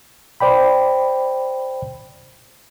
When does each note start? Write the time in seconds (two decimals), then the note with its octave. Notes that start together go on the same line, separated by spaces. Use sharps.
0.40 C5 D5 G5 B5